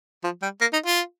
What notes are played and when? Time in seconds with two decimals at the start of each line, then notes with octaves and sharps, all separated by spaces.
0.24 F3
0.42 G3
0.61 A#3
0.73 D#4
0.86 F4